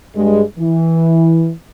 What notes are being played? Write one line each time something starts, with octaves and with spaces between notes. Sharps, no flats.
G2 G#3
E3